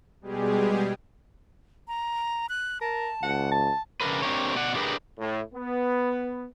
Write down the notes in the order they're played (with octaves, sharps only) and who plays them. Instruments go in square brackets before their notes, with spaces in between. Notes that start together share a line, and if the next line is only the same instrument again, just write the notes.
[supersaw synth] B2 G3 G#3 G4 G#4
[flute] A#5
F#6
[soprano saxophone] A#4 [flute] A5
[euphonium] C#2 [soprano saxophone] F#5
[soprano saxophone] A5
[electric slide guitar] C#3 D4 A#4 B4
C4 D4 G4 A#4 C#5
B2 D5 F#5
D4 G4 G#4 A#4 B4 D5
[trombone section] A2
B3